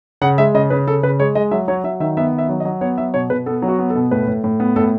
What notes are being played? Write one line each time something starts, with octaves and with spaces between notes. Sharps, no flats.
C#3 F#5
G#3 E5
C#3 D#5
C#3 B4
C#3 A4
C#3 B4
G#3 C#5
G#3 D#5
F#3 E5
F#3 C#5
F#3 E5
D#3 E5
B3 E5
D#3
E5
F#3
D#5
F#3
B3 C#5
F#3 E5
B2 C#5
B2 B4
B3 A4
F#3
F#4
B3
A4
B2
A2 B4
A2
A2
B3
A2 A4